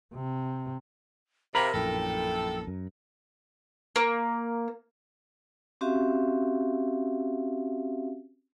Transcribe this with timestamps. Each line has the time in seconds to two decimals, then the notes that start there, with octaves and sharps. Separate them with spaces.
0.14 C3
1.55 C3 A#4 F5 A#5 B5
1.74 A#1 F#2 A2 A4 G5
2.67 F#2
3.96 A#3
5.81 C4 C#4 F#4 G4 E5 F5